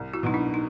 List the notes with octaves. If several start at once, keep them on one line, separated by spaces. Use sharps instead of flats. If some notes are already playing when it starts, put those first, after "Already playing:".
Already playing: C2
E4 F#4
B2 F#3 D#4
D4 E4
D#4